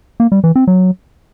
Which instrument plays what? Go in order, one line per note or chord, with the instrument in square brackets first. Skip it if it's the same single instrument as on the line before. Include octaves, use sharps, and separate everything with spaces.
[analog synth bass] A#3
G3
E3
C4
F#3